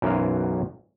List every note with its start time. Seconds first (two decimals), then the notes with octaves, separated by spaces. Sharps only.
0.02 B1 F#2 E3 F#3 C5 F5